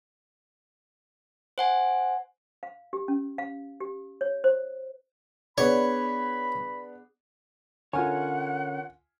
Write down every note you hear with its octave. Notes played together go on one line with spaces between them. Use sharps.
C5 F#5 G#5
F5
G4
C#4
F5
G4
C#5
C5
B3 D4 G#4 C#5 D5 B5
D3 C#4 F4 A#4 C#5 F#5 G#5